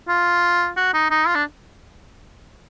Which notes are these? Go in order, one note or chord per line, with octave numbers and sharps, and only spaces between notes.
F4
F#4
D#4
D#4
F4
D4